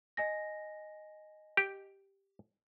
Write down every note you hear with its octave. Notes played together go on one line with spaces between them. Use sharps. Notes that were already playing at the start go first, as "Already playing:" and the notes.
D#5 G#5 A#6
G4